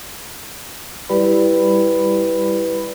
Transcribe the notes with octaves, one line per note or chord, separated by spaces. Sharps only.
G3 E4 G4 B4 D5 B5